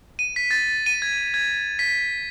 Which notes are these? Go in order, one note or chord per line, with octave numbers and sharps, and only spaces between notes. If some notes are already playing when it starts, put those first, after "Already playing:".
D#7
B6
A6
D#7
G#6
G#6
B6